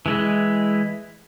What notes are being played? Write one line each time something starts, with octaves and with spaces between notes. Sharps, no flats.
E3 G#3 E4